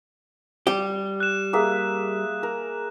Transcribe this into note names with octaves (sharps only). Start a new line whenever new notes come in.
G3 G4
F#6 E7
A#3 G#4 E5
A#4